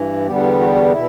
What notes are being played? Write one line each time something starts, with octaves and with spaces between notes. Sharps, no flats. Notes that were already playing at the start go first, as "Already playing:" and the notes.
Already playing: G2 E3
E2 D3 G3 B3 G4
G4
F#4
F#4
B2 E4